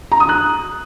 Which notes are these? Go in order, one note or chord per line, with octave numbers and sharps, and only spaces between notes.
A#5
D#6
F#6